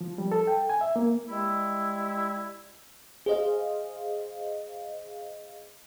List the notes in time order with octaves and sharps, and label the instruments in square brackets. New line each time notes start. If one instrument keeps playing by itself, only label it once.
[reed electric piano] F3
G3
A4
G5
G#5
E5
A#3
[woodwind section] G3 G#3 E4
[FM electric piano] G#4 C5 D#5 F5